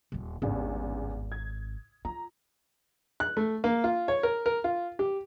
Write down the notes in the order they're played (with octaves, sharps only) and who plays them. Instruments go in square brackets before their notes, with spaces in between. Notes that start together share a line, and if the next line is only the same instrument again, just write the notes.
[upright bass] D#1 E2
[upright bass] G#1 [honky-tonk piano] E2 G2 C#3
[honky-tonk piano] G#6
[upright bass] F4 [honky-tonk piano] A#5
[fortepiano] F#6
A3
A#3
F4
C#5
A#4
A#4
F4
G4